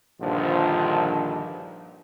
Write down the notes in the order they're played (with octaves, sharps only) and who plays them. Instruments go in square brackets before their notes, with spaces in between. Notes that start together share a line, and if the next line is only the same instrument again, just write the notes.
[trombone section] A#1 G2 D3 D#3 F3